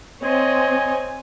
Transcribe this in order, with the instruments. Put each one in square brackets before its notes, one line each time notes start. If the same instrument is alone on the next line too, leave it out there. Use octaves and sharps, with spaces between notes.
[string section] C4 [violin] C#5 D#5 [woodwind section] G#5